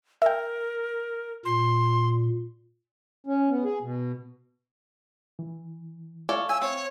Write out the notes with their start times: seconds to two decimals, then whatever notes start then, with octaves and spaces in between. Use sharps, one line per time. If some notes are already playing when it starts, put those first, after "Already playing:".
0.22 A#4 E5 G5
1.45 A#2 C6
3.27 C#4
3.50 B3
3.64 G#4
3.82 B2
5.39 E3
6.29 A4 C#5 D5 E5 F5 F6
6.49 G#5 E6
6.62 C4 C#5